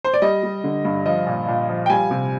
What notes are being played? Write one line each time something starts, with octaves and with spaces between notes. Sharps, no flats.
C5
D5
G3 D#5
G3
D3
G2
F3 D#5
A#2
A#2
F3
G5
G3 G#5
C3